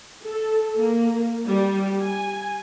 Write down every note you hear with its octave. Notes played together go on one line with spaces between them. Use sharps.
A4
A#3
G3
G#5